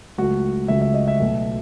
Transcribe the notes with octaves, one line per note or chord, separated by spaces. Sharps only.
C#2 C#3 F#3 A3 F#4
C#2 C#3 F#3 A3 E5
E5
D#5
E5
B1 B2 A3